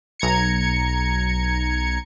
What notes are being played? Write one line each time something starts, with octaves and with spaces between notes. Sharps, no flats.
B1 A#5 G#6 C#7